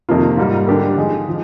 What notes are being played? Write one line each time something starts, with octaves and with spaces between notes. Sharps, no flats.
F2 C3 D#3 A#3 F4
G#2 G3 A#3 F4
D3 G3 D4 G4 A#4
F3 G#3 D#4 G#4
F3